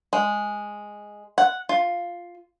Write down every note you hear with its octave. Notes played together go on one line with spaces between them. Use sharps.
G#3
F#5
F4